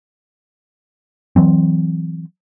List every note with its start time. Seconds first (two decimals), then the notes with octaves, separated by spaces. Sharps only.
1.36 E3 F#3 C4